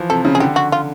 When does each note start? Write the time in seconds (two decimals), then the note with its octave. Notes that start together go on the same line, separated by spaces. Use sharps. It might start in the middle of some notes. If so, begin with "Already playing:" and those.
Already playing: E3 F3
0.10 C3 A4
0.25 C#3
0.35 G#4
0.40 D3 G4
0.56 F#4
0.72 F4